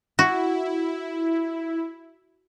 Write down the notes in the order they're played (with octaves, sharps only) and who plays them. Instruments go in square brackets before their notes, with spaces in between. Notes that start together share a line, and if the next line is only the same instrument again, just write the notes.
[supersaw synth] E4 [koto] F#4